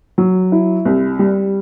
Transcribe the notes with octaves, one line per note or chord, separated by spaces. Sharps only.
F#3
E4
C2
G3